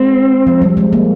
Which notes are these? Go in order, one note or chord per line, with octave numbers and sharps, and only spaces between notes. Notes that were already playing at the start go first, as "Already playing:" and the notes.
Already playing: G#3 C4
F3
G3
G#3
A#3